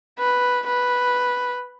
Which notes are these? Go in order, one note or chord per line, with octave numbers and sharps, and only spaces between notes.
B4
B4